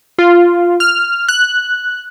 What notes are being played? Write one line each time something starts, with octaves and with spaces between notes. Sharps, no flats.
F4
F6
F#6